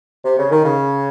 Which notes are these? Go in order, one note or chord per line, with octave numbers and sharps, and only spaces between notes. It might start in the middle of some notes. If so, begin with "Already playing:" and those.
C3
C#3
D#3
C#3